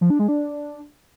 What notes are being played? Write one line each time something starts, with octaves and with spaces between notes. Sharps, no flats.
F3
D4
G#3
D4